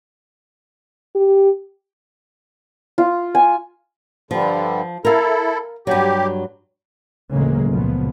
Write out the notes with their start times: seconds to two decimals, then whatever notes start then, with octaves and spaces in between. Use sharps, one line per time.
1.15 G4
2.98 F4
3.35 G#5
4.31 G2 D3 F3 G3
5.05 E4 A4 A#4 F5
5.87 G2 F#3 G4
7.32 A1 D2 C#3 F#3 G#3 A#3
7.71 C#2 F#2 A#2 C#3 F3 B3